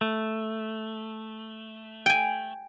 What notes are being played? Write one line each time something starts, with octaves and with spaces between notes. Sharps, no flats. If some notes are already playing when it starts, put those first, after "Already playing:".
A3
G5 G#5